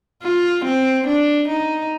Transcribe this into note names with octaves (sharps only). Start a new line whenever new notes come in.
F4
C4
D4
D#4